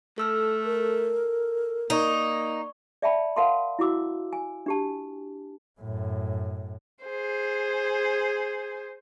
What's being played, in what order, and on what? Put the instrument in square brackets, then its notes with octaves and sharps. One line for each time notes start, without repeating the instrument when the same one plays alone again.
[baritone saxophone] A3 [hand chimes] A4 E6 F6
[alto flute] A#4
[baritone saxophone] A#3 [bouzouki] D#4 [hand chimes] D5 C#6
[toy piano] D5 E5 G5 A5 B5
A#4 F5 F#5 A5 C6
E4 F#4 D6 E6
G#5
D4 G4 A5
[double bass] F#2 A2
[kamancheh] G#4 C5